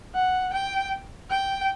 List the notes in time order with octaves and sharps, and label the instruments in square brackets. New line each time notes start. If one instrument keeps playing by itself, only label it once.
[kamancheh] F#5
G5
G5